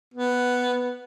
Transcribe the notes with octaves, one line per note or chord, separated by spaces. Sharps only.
B3